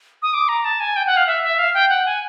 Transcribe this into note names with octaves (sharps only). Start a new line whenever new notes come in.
D#6
D6
A#5
A5
G#5
G5
F#5
F5
E5
E5
F5
G5
F#5
G#5